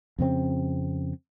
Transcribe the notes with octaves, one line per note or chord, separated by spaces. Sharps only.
F2 C#3 C4